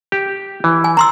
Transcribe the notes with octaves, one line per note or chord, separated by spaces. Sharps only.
G4
E3
G#5
A#5 C6 E6